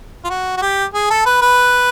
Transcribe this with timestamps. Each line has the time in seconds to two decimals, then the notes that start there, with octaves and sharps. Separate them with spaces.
0.25 F4
0.30 F#4
0.57 F#4
0.62 G4
0.94 G#4
1.10 A4
1.26 B4
1.42 B4